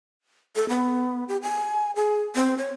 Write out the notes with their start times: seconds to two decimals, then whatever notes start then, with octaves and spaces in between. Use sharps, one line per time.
0.56 A4
0.69 B3
1.28 G4
1.42 G#5
1.96 G#4
2.36 C4
2.58 C#5